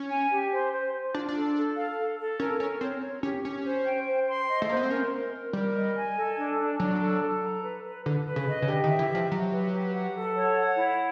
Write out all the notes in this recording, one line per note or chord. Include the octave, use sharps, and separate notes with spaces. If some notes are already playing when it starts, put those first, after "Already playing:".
Already playing: C#4
G#5
G4
C5
C5
C5
D4 F4
D4
A4
A4
F5
A4
A4
C#4 A#4
C#4 A#4
C4 C#5
C#5
C#4 G4
C#4 G4
C5
G5
C5
C6
D#5
A3
A#3 C5
B3
C4
C#4 A#4
A#4
A#4
G3 A#4
D#5
G#5
A4
D4
D4
F#3 D4
A4
A4
A#5
B4
B4
D3 B4
B4
C#3
D#5
C#3
D3 G4
D#3
E5
E3
G4
F3
F#3 G4
B4
G4
F#5
A4
C#5
F#5
E4